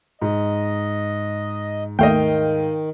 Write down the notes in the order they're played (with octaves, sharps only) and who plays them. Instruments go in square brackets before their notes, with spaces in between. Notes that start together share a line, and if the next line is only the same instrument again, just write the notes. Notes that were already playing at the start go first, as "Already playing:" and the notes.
[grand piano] G#2 [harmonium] D#5
[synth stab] D#2 A3 [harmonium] D#3 [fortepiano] D#5 F5 G5